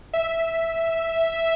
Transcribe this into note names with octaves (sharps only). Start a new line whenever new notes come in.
E5